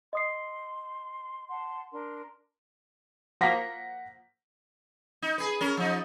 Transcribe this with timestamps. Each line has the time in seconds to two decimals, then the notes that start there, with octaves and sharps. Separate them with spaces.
0.13 D#5 C6 D#6 C7
1.49 F#5 A5 C6
1.92 D4 A#4 C6
3.41 F3 A#3 F#5 A#6 B6
5.22 D#4
5.38 G#4 B4
5.61 C#4 A#4
5.77 F3 D#4